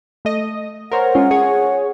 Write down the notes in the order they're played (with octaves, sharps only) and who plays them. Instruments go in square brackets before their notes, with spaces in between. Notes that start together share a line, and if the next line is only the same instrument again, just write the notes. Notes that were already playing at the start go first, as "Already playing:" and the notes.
[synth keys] A3 D#5
[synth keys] A#4 C5 C#5 [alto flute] F#5
[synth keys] G#3 C#4 F4
G#4 C#5